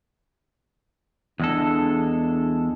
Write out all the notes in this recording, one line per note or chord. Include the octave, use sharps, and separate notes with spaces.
E2 G#3 D4 A4